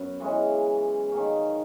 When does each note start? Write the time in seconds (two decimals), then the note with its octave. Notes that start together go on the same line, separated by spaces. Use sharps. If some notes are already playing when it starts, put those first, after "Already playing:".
Already playing: F#2 B3
0.20 C#3 E3 G#3 C#4
1.12 D#3 A#3 C#4